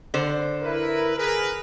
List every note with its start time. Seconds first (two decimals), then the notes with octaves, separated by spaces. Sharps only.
0.14 D3 C5
0.62 E4 A#4 B4
1.17 G#4 A#4 B4